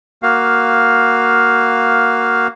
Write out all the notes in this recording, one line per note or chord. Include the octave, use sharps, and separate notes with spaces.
A#3 F#4 F5